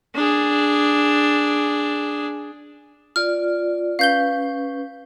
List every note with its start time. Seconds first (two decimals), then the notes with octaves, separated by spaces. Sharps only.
0.15 D4 G#4
3.16 F4 D5 F6
3.99 C#4 B4 F5 G6 G7